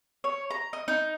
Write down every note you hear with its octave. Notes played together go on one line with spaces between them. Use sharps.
C#5
A#5
D#5
D#4